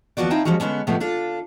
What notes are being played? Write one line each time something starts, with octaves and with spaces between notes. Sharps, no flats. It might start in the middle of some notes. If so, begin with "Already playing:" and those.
D#2 F3 B3 F#4 D5
C4 D#4 E4 F5 G5 A5
F3 G3 G#3 C#4 F#4
D3 G#3 B3 C#4 D4
A2 C3 F3 G#3 A3 B3
D4 F4 A4